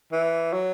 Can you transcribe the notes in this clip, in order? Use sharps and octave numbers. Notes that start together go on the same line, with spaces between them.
E3
F#3